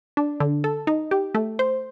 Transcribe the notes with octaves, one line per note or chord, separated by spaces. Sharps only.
D4
D3
A4
D#4
G4
A3
C5